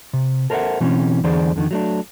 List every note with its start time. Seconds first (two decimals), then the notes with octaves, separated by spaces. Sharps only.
0.13 C3
0.50 A4 A#4 C5 D5 E5 F#5
0.80 B2 E3 C4 C#4
1.24 E2 D3 E3 G#4 C5 D5
1.56 F2 D3 D#3
1.71 F#3 A3 D4